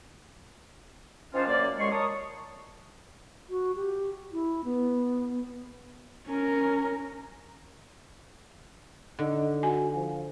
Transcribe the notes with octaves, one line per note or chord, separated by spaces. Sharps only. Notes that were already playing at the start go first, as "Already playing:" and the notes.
D#3 F3 C#4 D4 F4 C5
F#2 A#3 D5
C2 F#2 G#3 C6 C#6
A#4 C#5 A5 C#6 D#6
F#4
G4
E4
B3
C#4 A#4
D3 D#4
F#4 G#5
F3